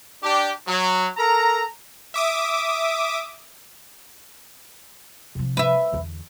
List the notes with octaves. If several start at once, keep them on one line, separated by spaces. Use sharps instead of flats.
D4 G4
F#3
A4 A#4 A#5
E5 D6 D#6
C3 F3
B4 E5
E2 D3